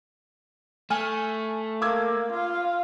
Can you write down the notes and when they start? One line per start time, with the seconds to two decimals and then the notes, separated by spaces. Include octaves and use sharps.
0.90 A3 G#5 F6
1.82 A#3 D6 E6 G#6
2.33 F4 F5